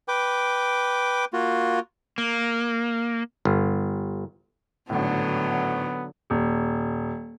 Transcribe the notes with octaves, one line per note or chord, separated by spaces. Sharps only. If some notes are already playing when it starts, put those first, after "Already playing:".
B4 G5 D6
A#3 F4 F#4
A#3
G1
G#1 A2 D3 F#3 B3
D#1